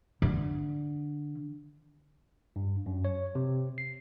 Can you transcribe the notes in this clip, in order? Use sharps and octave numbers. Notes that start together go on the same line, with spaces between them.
D3
G2
F#2
C#5
C3
C7